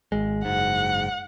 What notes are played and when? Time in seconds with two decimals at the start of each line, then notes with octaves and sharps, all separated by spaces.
0.12 G#1 G#3
0.45 F#1 G#2 F#5